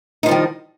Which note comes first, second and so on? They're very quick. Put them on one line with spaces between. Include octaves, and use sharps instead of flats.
D#4 F3 G3 D#3